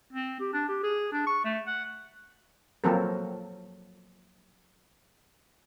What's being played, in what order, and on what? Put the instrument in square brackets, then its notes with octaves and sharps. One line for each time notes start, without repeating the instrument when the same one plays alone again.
[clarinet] C4
G4
D4
G4
G#4
D4
C#6
A3
F#5
[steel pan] F3 F#3 A#3 C4 A4 A#4